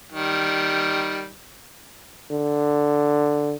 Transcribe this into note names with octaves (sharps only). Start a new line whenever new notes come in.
D#3 G3
D3